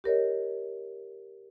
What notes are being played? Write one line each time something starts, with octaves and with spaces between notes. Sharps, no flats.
G4 A#4 C#5 D#5